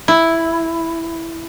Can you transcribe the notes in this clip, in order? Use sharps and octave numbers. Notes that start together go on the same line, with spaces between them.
E4